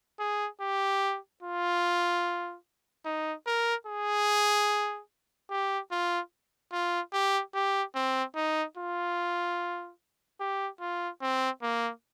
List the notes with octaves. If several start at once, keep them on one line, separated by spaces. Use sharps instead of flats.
G#4
G4
F4
D#4
A#4
G#4
G4
F4
F4
G4
G4
C4
D#4
F4
G4
F4
C4
A#3